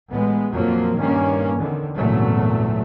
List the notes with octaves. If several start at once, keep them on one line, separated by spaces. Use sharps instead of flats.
A1 G#3 B3
A#1 F2 F3 F#3 A#3
G2 D#3 A#3 C#4
E2 D3 D#3
G#1 E2 A#2 C#3 F#3 A3